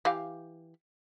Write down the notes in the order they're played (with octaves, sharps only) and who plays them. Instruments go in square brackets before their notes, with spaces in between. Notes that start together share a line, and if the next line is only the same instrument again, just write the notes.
[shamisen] E3 G4 F5